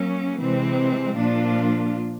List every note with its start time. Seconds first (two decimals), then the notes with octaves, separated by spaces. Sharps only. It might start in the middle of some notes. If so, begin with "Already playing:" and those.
Already playing: F#3 A#3 C#4
0.39 C3 E3 G#3 C4
1.16 A#2 F3 A#3 D4 F4